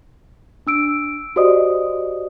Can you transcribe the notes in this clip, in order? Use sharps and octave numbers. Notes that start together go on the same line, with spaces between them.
D4 E6 D7
F#4 G4 C5 D5 D#5 D#6